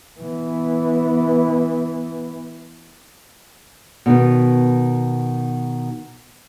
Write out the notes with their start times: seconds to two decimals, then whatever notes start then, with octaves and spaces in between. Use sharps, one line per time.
0.20 E3 B3
4.06 B2 D#3 B3